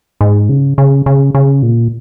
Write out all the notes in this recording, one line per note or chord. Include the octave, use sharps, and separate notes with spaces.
G#2
C#3
C#3
C#3
C#3
A#2